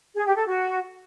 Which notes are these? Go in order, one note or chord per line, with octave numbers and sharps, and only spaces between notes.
G#4
G4
A4
F#4